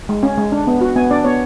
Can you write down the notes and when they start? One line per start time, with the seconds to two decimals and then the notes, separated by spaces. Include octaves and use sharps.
0.09 G#3
0.23 C#4
0.38 G#3
0.52 D4
0.67 B3
0.81 F#4
0.96 B3 G#5
1.11 D4 D5
1.24 B3 C#5